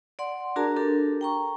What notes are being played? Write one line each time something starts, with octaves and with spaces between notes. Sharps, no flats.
D5 F#5 C6
D4 F#4 G#4 A#4 A5 A#5
D4 G4 A4 A#4
G5 A#5 C#6